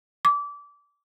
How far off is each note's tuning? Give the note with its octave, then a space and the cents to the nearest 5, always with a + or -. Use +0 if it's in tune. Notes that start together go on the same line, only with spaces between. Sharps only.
D6 -25